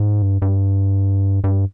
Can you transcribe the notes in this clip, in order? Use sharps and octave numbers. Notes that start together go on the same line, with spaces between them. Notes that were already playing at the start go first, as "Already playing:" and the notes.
Already playing: G#2
G2
G2
G2